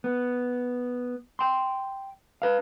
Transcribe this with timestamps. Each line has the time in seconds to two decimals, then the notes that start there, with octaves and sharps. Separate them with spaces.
0.04 B3
1.39 G5 C6
2.42 B4 F5